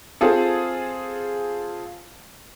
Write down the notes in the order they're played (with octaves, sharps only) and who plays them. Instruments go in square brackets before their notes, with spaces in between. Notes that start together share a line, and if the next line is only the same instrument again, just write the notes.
[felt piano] C4 F4 G#4 A4